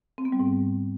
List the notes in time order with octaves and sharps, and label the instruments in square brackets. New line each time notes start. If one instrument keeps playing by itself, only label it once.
[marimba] C4
B3
G3
G#2